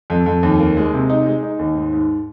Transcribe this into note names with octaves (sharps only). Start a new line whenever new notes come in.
F2
F2
D#2
A#3
G#3
C3
D#4
G#3
D#4
D#2
G#2
G#2